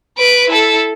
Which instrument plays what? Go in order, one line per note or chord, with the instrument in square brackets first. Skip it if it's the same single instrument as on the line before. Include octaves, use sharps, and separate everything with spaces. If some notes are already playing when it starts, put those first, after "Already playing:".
[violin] B4 D7
E4 A4